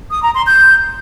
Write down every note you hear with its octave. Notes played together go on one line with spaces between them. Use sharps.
D#6
A#5
C6
G6